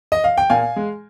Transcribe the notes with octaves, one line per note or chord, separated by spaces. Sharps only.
D#5
F5
G5
A#2 F5 G#5
G#3